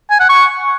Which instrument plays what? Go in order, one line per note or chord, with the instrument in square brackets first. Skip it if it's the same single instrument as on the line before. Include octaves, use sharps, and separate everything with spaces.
[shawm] G#5
F#5
C#6